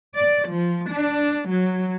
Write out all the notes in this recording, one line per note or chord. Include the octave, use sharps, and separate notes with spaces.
D5
F3
D4
F#3